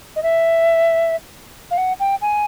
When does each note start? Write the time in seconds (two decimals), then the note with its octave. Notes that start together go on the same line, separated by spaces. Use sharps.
0.16 D#5
0.23 E5
1.71 F5
1.78 F#5
2.00 G5
2.22 G#5